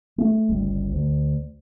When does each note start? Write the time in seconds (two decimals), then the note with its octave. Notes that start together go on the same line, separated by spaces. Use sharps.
0.18 A3
0.49 G1 C#2 G3
0.93 D2